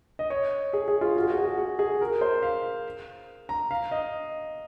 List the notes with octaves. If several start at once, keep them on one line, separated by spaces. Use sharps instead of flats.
D#5
C#5
G#4
G#4
F4
F#4
G#4
F#4
G#4
F#4
F#4
G#4
A#4
C5
F5
A#5
F5
D#5